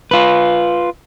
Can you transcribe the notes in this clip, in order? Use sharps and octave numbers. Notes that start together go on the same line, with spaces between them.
F4 B4